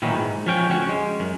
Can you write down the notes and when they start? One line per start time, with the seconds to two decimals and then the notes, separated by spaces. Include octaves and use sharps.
0.02 A#2 D#3 E3 F#3 D#4
0.14 G#2
0.47 F3 C#4 G5
0.70 D2 C#4 F#4
0.89 G#3
1.20 F#2